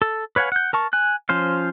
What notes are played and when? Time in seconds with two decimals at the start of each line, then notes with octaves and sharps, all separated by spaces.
0.02 A4
0.36 B4 C#5 F5 F#5 G#5
0.52 F#5 G6
0.73 A#4 A5 C#6
0.93 G#5 F#6
1.29 F3 C#4 C5 F5